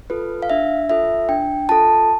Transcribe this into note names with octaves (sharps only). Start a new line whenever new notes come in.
F4 A4 B4
F5
D4 E5
F4 A4 E5
D4 G5
F4 A4 A5